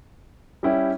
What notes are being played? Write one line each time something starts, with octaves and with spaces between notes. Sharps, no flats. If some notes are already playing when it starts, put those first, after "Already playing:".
G3 C#4 E4 G4